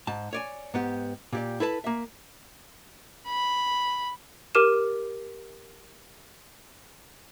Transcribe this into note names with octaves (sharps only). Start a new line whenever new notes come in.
G#2 A5
C#5 D5 G#5
G#2 B3 G4
A#2 G4 D5
E4 A4 B4 A5
A#3 E5
B5
G4 A#4 D6 F6 D#7 E7